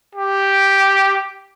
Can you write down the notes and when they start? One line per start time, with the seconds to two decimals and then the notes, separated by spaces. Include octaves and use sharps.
0.15 G4